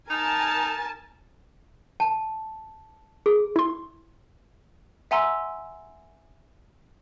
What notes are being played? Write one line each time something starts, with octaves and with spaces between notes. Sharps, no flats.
D#4 A#4 G#5 A5
A5
G#4
E4 C6
E5 F#5 G#5 A#5 C6 E6